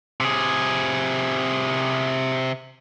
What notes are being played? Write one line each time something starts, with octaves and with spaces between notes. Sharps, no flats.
C3 G#4